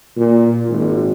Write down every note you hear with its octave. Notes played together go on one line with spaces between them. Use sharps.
A#2
G#1